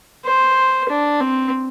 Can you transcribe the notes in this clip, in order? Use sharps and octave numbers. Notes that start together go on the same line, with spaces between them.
C5
D4
C4